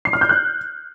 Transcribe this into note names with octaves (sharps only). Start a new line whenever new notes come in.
C7
F6
G6
F#6